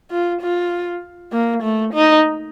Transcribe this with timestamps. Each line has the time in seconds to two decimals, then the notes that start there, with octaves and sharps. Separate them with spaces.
0.11 F4
0.41 F4
1.33 A#3
1.63 A3
1.94 D#4